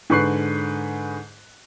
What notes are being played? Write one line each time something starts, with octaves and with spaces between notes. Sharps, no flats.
G#2 D3 B4 C#6 F#6 C7